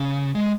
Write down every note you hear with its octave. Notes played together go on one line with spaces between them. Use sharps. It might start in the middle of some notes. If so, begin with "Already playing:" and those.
Already playing: C#3
G#3